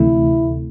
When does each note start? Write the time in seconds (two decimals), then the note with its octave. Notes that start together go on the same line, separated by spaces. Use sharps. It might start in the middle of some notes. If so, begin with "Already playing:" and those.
Already playing: D2 C3 E3 A3 E4